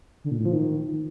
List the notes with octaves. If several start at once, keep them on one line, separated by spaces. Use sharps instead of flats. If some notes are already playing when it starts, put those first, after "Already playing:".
D3
A#2
A2
F3
D#3